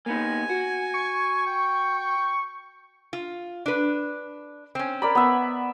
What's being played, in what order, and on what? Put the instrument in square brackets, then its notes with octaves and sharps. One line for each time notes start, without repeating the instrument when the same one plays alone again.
[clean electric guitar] A#3 B3 D#4 [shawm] G#5
[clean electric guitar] F#4
[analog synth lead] C#6
[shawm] G5
[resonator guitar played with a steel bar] F4
D4 B4
C4 C#4
[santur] A#4 D5 B5
B3 E5